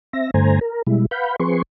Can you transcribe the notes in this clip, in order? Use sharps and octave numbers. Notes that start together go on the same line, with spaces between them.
C4 E5 A#6
G2 D3 A3 C5 G#5 A#5
A#4
B2 G3 G#3 E4
B4 F5 F#5 B5 G6
F3 C4 G#4 B4 C6 C#6